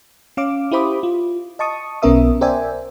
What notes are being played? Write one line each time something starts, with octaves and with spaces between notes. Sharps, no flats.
C#4 F5 D6
E4 G4 C5 B5 D6 D#6
F4
D#5 A5 C#6 D#6
B1 B3 C#4 A#4 E5 D#6
A#4 C5 D5 E5 G5 G#5